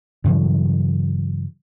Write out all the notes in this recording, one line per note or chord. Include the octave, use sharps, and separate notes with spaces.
G2 C#3 E3 F#3